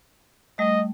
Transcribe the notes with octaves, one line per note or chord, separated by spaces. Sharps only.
G3 A3 D#5